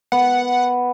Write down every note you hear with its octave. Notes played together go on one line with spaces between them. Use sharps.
B3 F#5